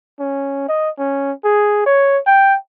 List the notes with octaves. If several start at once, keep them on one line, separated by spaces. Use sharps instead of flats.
C#4
D#5
C#4
G#4
C#5
G5